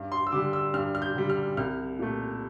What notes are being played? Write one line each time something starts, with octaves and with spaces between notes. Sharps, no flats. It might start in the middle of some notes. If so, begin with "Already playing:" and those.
Already playing: G2
C6
E6
D3 G3 D6
E6
G2 F6
F6
G6
D3 G3
F6
C2 F6
A#2 A3